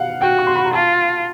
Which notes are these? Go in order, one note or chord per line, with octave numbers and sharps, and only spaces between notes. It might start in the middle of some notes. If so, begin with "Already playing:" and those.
Already playing: F5 F#5
F#4 G5
C#6
C6
B5
A#5
F4 A5